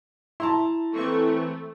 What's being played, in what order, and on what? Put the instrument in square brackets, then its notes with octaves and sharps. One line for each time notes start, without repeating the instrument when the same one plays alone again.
[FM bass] E4 [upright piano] A5 A#5 C6
[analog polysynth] E3 C4 C#6 [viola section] A3